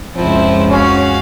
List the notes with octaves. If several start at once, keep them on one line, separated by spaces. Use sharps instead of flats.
F#1 C#2 F3 C4 E4
C#4 F#4 F5